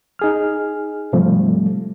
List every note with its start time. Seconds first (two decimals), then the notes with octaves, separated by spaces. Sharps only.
0.19 D#4 G#4 F6
1.13 G#2 C3 F3 G3 A3